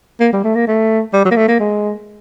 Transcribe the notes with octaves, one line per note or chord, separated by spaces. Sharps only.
A#3
G3
A3
A#3
A3
G3
F#3
A#3
A3
A#3
G#3